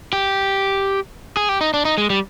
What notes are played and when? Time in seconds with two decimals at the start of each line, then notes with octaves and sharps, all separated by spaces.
0.13 G4
1.37 G#4
1.49 G4
1.61 D#4
1.74 D4
1.85 D#4
1.98 G#3
2.10 G3